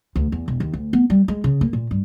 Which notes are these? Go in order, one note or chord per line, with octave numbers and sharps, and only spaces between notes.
D2
E2
E1
D#2
D2
B3
G3
G#3
C#3
A#3
A#2
G2